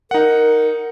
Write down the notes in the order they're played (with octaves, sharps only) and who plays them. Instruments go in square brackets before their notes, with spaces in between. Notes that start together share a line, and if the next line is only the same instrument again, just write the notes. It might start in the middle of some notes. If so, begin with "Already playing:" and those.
[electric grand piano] D#4 F#5 [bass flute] A#4